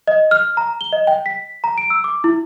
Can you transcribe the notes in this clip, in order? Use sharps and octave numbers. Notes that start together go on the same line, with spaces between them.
D#5
F6
A#5
G7
D#5
G5
B6
A#5
D7
E6
D6
E4